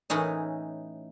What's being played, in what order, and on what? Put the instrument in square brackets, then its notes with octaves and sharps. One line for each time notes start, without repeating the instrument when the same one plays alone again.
[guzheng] A2 E3 C#4 D#4